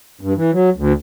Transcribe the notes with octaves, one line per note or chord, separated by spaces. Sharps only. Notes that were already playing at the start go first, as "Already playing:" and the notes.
G2
E3
F#3
D2